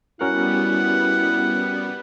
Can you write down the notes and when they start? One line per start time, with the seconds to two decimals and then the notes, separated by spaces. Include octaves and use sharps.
0.21 G3 B3 C#4 E4 F#4 A#4 F#5